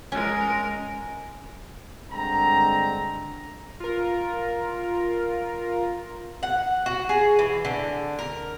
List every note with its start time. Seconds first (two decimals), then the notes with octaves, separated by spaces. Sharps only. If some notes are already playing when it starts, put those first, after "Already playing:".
0.12 G#3 C#4 A#4
2.11 G2 D3 G#3 C4 A#5
3.80 F4 A#4
6.43 F#5
6.86 F#4
7.09 G#4
7.39 E3
7.65 D3
8.19 A#4